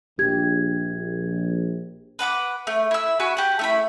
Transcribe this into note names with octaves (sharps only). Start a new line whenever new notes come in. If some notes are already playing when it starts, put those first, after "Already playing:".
A#1 G4 G#6
B4 F#5 C#6 D6
A3
E4 E6
F#4 G#5 B5 C#6
G4 F#5
A3 E4 B5